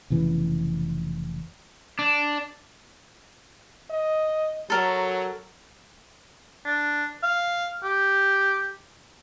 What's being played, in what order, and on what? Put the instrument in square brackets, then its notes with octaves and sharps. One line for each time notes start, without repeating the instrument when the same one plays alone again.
[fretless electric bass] F1 C#3 E3 B3
[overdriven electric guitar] D4
[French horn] D#5
[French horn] F#3 [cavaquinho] A4 A#4
[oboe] D4
F5
G4